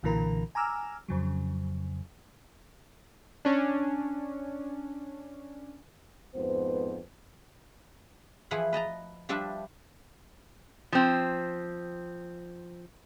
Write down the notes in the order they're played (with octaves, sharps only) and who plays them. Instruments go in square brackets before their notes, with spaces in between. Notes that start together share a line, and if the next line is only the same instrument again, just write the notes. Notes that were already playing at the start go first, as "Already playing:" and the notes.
[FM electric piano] B1 A#2 D3 E3 A#4 A#5
G#5 A#5 D6 E6 F6
F2 C#3 F#3
[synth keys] C#4 D4
[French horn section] F2 G#2 B3 B4 C5
[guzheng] E3 F3 E4 G#4 B4 F#5
B4 D#5 A5 A#5
F3 G3 D4 B4 E5
[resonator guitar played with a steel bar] F3 C4